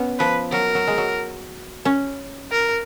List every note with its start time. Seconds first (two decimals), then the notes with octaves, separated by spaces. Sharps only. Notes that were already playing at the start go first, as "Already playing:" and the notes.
Already playing: B3 C#4
0.19 F3 B4
0.52 F#3 A#4
0.75 F#3
0.87 G#3
0.98 F#3
1.85 C#4
2.51 A#4